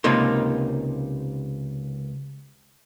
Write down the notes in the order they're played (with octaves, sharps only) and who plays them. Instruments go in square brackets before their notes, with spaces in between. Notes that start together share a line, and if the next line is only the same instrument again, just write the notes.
[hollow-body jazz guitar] C#2 C3 A#3 D#4 C6